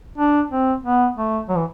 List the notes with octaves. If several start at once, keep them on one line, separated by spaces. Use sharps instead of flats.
D4
C4
B3
A3
F#3
E3